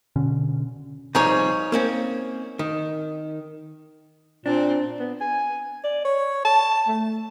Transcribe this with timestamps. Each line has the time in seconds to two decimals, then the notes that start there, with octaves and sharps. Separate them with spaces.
0.16 B2 D3 C#4
1.15 C3 F3 G3 D#4 G#4 C#5
1.72 A#3 C4 C#4
2.59 D#3
4.46 A#2 C4 D4
5.00 B3
5.21 G#5
5.84 D5
6.05 C#5
6.45 A5
6.88 A3